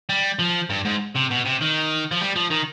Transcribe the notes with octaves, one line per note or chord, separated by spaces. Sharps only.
G3
F3
G2
G#2
C3
B2
C3
D#3
F3
G3
F3
D#3